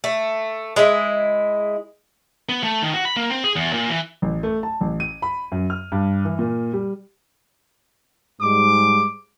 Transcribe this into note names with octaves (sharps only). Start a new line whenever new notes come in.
A3
G#3 E4
B3
A3
D#3
F#4
B5
A#3
C4
G#4
E2
A#2
E3
A1
A3
A5
A1
D#7
B5
F#2
F6
G2
E3
A#2
G3
G#2 G3 G#3 D6